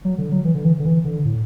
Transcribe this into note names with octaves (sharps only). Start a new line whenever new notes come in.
F#3
D3
F#3
E3
D3
E3
D3
E3
D3
A2